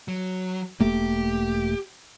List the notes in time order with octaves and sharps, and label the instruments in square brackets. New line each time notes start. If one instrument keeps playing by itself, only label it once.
[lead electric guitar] F#3
[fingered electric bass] E1 A3 A#3 [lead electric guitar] G4